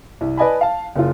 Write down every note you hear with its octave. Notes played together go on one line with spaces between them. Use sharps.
C2
B4 D5 D#5 G#5 A5 B5
F5 A5
F#1 F4